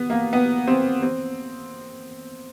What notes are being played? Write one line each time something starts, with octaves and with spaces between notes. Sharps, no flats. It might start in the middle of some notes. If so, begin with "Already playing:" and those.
Already playing: B3
A#3
B3
C4
C4